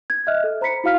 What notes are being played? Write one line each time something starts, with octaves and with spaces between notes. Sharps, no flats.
G#6
D#5 E5 F6 F#6
A4
C5 A#5 B5 B6 C#7
E4 F#4 F5 F6 B6